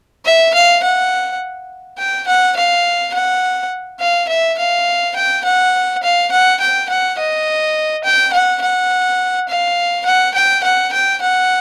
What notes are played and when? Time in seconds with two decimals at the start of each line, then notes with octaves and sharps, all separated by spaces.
0.25 E5
0.54 F5
0.83 F#5
1.98 G5
2.27 F#5
2.56 F5
3.14 F#5
4.00 F5
4.29 E5
4.58 F5
5.16 G5
5.44 F#5
6.03 F5
6.32 F#5
6.60 G5
6.89 F#5
7.18 D#5
8.04 G5
8.33 F#5
8.61 F#5
9.48 F5
10.05 F#5
10.34 G5
10.63 F#5
10.92 G5
11.21 F#5